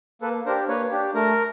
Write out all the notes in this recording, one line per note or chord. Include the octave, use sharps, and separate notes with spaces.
A#3 A4 B4
D4 G4 A#4 C5
A#3 B4 C#5
D4 G4
A3 A#4